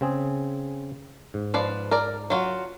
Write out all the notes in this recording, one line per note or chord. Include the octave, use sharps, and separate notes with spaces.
C#3 C4 G#4
G#2
F3 B4 D5
A#4 D5
F#3 F4 F#4